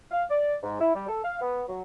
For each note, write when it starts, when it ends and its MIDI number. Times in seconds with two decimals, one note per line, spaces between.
0.11 0.23 77
0.30 0.55 74
0.63 0.79 44
0.80 0.94 64
0.94 1.07 55
1.09 1.22 69
1.23 1.37 77
1.41 1.63 59
1.68 1.82 54